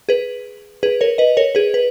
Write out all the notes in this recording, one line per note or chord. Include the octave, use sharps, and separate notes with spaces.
G#4 B4
G#4 B4
A#4 C#5
B4 D#5
A#4 C#5
G#4 B4
B4